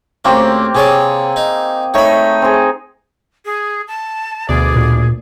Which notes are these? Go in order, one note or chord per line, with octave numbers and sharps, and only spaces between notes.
D2 A#3 C4 C#4 G4
C3 G#4 C#5 D5
D#4
A3 D#4 C#5 B5
C4 G#4
G#4
A5
D2 B2 G#4 D5
A#2